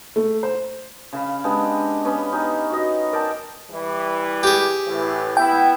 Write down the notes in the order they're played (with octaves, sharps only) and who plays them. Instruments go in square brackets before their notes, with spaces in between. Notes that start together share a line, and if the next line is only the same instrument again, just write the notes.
[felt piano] A3
C5
[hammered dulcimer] C#3 F5 B5
G#3 B3 D4 G4
B3 C#4
C#4 D#4 G4
F#4 D#5
A#4 D5 G5 A5
[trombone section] E3 G3
[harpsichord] G4 G#4
[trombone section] A2 E3
[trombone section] B3 E4 [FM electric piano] G5